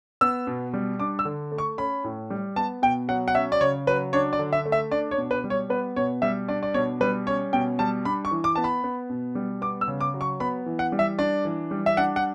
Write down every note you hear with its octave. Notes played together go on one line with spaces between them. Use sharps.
B3 E6
B2
G3
D4 D6
E6
D3
A3
C#6
C#4 B5
A2
G3
B3 A5
B2 G5
F#3 F#5
F#5
C#4 E5
D5
C#3 C#5
F#3 B4
D4 C#5
D5
D3
E5
A3
E5
D4 D5
C#5
B2
B4
G3
C#5
B3 B4
B2 C#5
G3 E5
D4 D5
D5
B2 C#5
G3 B4
C#4 C#5
B2 G5
G3 A5
D4 B5
C#6
E3
D6
B3 A5
B5
B3
B2
G3
B3 D6
E6
C#3
D6
F#3
C#6
B3 B5
E3
F#5
G3
E5
D4 D5
E3
G3
E5
D4 F#5
F#5